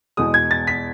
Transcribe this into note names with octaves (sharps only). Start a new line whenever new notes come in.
E2 B2 G#3 D#6
G#6
A6
B6